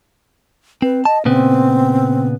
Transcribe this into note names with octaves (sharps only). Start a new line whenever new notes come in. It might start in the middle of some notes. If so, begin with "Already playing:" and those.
C4 B4
D#5 A5
A#2 C#3 B3 C4